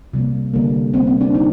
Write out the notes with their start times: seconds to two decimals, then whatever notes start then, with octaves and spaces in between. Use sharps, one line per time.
0.13 C3 G3 A#3
0.54 D3 G3 A#3
0.93 D3 G3 A#3 C4
1.07 C4
1.21 D4
1.35 D3 G3 A#3 D#4